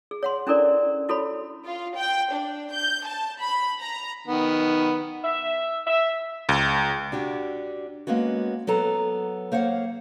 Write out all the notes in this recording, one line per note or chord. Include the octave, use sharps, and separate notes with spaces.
G#4
C#5 F#5 C6
C#4 D4 E4 A4 A#4 D5
E4 F#4 A4 C#5 B5
F4
G5
D4
G6
A5
B5
A#5
D#3 B3
E5
E5
C#2
D4 F#4 G4
G#3 A#3 B3 C#4 F#4
F#3 B3 A4 A#5
A#3 C5 C#5 F5 F#5